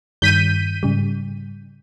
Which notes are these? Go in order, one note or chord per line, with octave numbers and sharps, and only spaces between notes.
G2 D#3 G3 G6 B6 D#7
G#2 C#3 G3